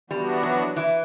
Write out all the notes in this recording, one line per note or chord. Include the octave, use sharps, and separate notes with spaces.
E3 G3 B3 D4 F#4
F#3
E3